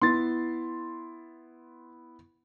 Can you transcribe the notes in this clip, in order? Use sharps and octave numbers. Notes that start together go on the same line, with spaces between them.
B3 E4 C6 A6